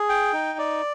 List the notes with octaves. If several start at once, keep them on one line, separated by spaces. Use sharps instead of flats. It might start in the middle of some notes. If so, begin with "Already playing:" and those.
Already playing: G#4
G5
D#4
D5